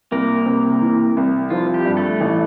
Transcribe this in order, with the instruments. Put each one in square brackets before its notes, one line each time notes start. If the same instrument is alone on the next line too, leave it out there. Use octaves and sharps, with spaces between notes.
[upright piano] C2 [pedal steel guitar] A#3 A#4
[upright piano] C3
E3
C2
[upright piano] F3 [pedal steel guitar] F4
[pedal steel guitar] G4
[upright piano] G2
[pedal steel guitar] A3 A4
[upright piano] A1